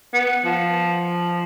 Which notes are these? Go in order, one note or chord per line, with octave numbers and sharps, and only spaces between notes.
B3
F3